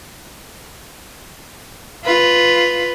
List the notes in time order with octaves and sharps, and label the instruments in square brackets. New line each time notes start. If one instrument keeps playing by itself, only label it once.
[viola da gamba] F4 B4